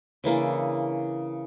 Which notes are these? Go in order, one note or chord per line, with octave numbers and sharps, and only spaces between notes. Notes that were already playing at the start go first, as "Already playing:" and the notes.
C#3 E3 A#3 D4